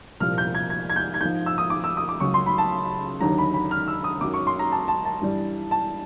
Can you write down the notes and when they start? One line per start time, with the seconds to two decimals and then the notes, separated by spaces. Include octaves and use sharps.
0.20 C2 A#2 F3 F6
0.38 G6
0.55 G#6
0.70 G#6
0.90 G#6
0.96 G6
1.14 G#6
1.21 G#2 F3 G6
1.46 E6
1.58 D#6
1.70 D6
1.84 E6
1.97 D#6
2.09 D6
2.20 C#2 C#3 F#3 C#6
2.34 C6
2.46 B5
2.58 A5
3.21 D#2 D3 F#3 A#5
3.38 B5
3.54 B5
3.71 F6
3.88 E6
4.04 D#6
4.21 F#2 D#3 F#3 D6
4.34 C#6
4.47 C6
4.59 A#5
4.72 A5
4.88 A5
5.05 A5
5.21 G2 E3 G3
5.71 A5